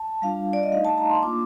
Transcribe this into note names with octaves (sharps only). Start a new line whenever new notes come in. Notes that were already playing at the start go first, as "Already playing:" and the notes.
Already playing: A5
G3 D4 F4 F5
D5
D#5
A3 D#4 F5
A5
A#5
C6
A#3 D4 F4 D6